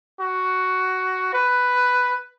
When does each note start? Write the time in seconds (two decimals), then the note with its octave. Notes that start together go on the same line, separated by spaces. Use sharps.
0.20 F#4
1.34 B4